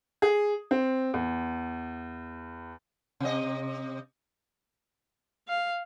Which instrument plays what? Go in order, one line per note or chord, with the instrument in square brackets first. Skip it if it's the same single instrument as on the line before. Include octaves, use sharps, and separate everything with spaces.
[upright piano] G#4
C4
E2
[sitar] C3 D#5
[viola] F5